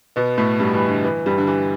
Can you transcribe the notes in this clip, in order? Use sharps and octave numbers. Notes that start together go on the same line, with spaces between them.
B2 B3
A2 A3
G2 G3
E3
D3
E3
G2 G3
D3
E3